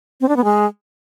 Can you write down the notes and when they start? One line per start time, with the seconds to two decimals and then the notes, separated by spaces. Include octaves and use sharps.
0.21 C4
0.29 D4
0.36 B3
0.44 G#3